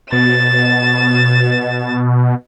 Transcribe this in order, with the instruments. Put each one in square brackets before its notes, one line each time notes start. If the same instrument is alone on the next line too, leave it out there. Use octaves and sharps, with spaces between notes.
[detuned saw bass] B2 [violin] A6 E7